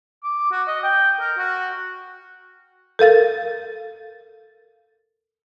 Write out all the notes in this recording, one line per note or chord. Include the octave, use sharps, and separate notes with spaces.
D6
F#4
D#5
G5
A#4
F#4
A4 A#4 F5 A6